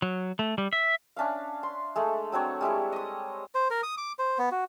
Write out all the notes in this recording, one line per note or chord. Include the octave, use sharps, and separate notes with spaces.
F#3
A3
G3
E5
C#4 D4 E5 F5
C6
G#3 A3 A4
F#3 C4 D4 C#5
G3 G#3 E4 A4
D#5 D#6
C5
A#4
D#6
D6
C5
B3
F#4